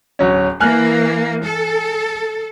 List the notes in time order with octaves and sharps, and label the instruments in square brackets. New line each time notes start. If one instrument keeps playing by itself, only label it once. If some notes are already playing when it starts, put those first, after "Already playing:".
[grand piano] D1 F#3 C#4
[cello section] E3 A#3 [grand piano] G#5 F6 F#6
[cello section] A4